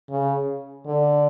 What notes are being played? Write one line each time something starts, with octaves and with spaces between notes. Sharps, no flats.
C#3
D3